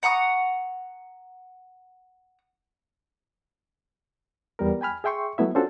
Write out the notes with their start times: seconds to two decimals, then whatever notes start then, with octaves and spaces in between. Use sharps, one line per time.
0.03 F#5 A#5 C#6 D#6
4.59 E2 G3 B3 A#4
4.81 G5 G#5 B5 F6
5.04 G#4 E5 G5 C6 C#6
5.38 F#3 A3 B3 E4 E5
5.55 C#4 D4 F4 F#4 A4 C5